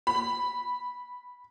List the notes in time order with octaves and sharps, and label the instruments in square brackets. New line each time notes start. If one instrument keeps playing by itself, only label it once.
[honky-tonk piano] B5